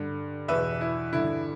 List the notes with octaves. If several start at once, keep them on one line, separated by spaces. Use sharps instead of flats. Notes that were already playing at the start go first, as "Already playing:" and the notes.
Already playing: G2 D3
E2 B2 B4 E5
E4
G2 D3 E4